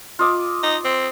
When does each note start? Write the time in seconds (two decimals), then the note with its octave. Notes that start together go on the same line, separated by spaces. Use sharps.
0.19 F4 D#5 D6
0.63 D#4
0.85 C4